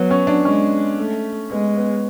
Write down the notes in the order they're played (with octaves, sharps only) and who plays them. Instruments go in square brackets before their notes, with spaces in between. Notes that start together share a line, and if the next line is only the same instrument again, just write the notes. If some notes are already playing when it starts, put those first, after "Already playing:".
Already playing: [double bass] F#3 [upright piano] B3
[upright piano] C#4
D4
[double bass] G#3 [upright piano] C#4
[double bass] A3
[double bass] G#3 [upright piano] B3
[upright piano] B3